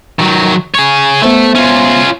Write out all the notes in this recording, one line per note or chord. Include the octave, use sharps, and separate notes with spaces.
D#3 F#3
G#4 C#5
A3 B3 C5 E5
C#4 F4